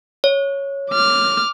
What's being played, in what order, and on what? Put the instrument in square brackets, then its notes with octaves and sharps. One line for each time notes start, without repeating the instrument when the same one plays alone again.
[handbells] C#5
[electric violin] D6 F6